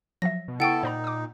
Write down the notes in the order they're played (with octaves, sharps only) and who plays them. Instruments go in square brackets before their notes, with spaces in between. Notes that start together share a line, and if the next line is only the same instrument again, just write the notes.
[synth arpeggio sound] F3 F#3 E5 [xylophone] A#6
[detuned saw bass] B2
[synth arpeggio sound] C#3 C#6 [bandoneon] B3 A4 A5 [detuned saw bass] E4 [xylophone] F#5 G5
[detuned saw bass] A#2 [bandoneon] D#4 [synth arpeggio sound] C5 D5 A#5
[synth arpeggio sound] D6 D#6